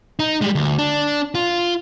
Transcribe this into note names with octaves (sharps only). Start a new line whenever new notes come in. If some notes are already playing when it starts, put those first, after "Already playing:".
D#4
G3 G#3
D2
D4
F4